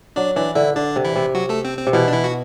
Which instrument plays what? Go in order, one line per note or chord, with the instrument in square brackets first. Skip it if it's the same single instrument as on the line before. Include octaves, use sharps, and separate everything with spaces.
[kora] F#3 [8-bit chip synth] D4 D5
[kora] E3 [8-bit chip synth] D4 D5
[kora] D3 [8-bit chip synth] E4 E5
[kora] D3 [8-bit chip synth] D4 D5
[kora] C3
[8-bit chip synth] E3 E4
[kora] C3
[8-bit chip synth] F#3 F#4
A3 A4
C4
C4
[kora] C3
[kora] B2 [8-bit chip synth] E3 E4
[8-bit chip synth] D4
E3 E4
F#4